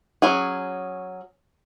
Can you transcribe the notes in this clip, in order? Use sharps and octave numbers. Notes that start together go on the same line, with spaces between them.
F#3 C#4 G#4